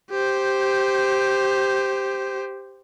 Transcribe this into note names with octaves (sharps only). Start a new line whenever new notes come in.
G4 C5